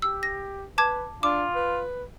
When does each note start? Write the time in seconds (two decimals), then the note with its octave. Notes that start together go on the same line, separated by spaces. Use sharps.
0.02 G4 E6
0.23 A#6
0.78 B4 A5 D6 G#6
1.23 D4 F4 D6
1.55 B4